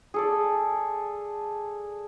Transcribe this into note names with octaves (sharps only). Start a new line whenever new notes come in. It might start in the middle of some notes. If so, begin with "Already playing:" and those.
G#4 A4 D5